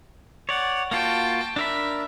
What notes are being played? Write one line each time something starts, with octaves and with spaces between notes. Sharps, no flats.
C#5 D5 F#5
A#3 F4 F#4 G5 A5
D4 A#4 E5 B5